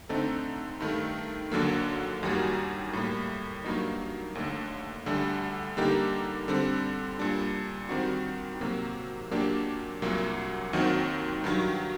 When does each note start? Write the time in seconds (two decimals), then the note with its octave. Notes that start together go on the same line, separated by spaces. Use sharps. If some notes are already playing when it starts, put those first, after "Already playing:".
0.09 D3 A3 C4 D#4 A4
0.80 G2 D#3 A3
1.52 D#2 D3 F#3 A#3
2.23 F#2 D#3 G3 A#3 F#4
2.93 A2 G3 A#3
3.64 G2 F#3 A#3 D#4
4.35 D#2 D3 A3
5.06 D2 D3 G3 D4
5.77 D3 G3 A#3 D#4 G4
6.48 D3 G3 C4
7.19 A#2 G3 D4
7.89 D#3 G3 C4 D#4 F#4
8.61 C3 F#3 A#3
9.31 A#2 F#3 A#3 D4 G4
10.02 C2 A#2 F#3 A#3
10.73 D#2 D#3 F#3 C4 F#4
11.44 G2 D#3 F#3